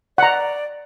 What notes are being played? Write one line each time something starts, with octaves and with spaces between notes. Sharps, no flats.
D5 F#5 A#5